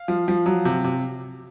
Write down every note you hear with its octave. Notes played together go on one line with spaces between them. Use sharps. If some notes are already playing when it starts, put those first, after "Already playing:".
Already playing: F5
F3
F3
F#3
C3
C3